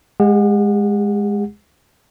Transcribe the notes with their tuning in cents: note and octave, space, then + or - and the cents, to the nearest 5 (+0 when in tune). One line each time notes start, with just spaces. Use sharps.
G#3 +0 G4 +45 F#5 -20